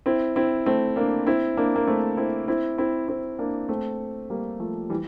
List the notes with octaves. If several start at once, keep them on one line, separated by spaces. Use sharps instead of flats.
C4 E4
C4 E4
A3 C4
A#3 D4
C4 E4
A#3 D4
A#3
A3 C4
C4 E4
C4 E4
C4 E4
C4 E4
A#3 D4
A3 C4
G3 A#3
F3 A3
E3 G3